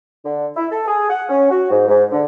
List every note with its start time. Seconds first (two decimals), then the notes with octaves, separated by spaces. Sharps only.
0.25 D3
0.57 E4
0.71 A4
0.87 G#4
1.10 F#5
1.29 C#4
1.51 F#4
1.71 G#2
1.88 G#2
2.12 D3